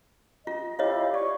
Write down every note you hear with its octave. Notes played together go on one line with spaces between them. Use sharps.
F4 D#5
E4 F4 G4 C#5 D#5 F5
C#5 D5 C#6